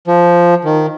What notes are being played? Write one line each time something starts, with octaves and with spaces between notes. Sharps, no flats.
F3
D#3